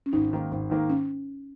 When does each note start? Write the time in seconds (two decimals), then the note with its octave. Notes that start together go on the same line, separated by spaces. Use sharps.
0.06 C#4
0.13 G#1 D#4
0.32 G#2 D#3 A#3
0.51 G#1
0.70 G#2 D#3 A#3
0.90 C#4